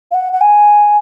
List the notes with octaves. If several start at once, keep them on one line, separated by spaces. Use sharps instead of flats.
F5
F#5
F#5
G#5